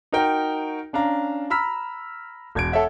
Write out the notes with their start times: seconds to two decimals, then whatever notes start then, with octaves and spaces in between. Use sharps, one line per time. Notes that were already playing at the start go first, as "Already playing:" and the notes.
0.12 D#4 F#4 A#4 G5
0.93 C#4 D4 F5 A#5
1.50 A#5 B5 E6 F6 B6
2.55 E1 G#6 D7
2.72 A4 C#5 E5 F#5